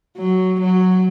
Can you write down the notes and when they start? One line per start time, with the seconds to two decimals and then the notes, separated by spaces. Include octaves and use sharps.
0.17 F#3
0.60 F#3